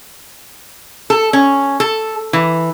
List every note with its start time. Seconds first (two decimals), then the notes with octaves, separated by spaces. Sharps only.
1.10 A4
1.33 C#4
1.80 A4
2.33 E3